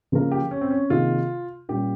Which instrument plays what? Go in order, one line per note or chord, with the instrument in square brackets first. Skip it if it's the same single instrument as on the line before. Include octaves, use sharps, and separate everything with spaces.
[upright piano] C#3 F3 A#3 F4 A#4
[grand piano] G4
C#4
C4
C#4
[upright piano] C3 D#3 A#3 D#4 G#4 [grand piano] F4
[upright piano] A#2 G3 A#3 C#4 F4 [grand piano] G4